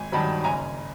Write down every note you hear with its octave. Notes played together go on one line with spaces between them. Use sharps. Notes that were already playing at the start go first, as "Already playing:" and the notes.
Already playing: G#1 G#5
G2 D#3 F#3 A5 B5
F#1 G#5 A#5